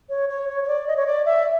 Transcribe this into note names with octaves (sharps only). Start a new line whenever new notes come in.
C#5
C#5
C#5
C#5
D5
D#5
C#5
D5
E5